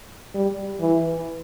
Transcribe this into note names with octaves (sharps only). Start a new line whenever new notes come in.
G3
E3